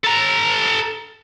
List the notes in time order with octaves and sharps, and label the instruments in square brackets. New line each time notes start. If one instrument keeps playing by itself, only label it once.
[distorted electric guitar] A4 A#5